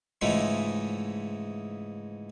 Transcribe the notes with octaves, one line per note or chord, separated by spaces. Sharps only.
G#2 C#3 E3 F3 G#3 A3